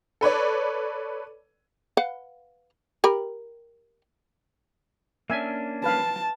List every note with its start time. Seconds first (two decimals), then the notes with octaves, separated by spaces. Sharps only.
0.21 A4 B4 C#5 D5
1.97 B4 F5 F#5
3.04 G4 A#4 B5
5.30 A#3 C#4 D4 E5 G#5
5.84 B4 F5 A5